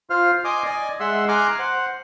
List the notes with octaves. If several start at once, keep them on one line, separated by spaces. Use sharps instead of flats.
F4 C5 F5 F6
D#5 G#5 C6 D6 D#6
D5 D#5 G#5
G#3 G#4 E5 F#5 C6 E6
G#5 A#5 C6 D6 F6 F#6
C5 F#5